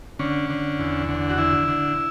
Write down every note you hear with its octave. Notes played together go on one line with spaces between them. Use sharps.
D3 C#4
D3
E2
D3
F#4
D3 E4
D3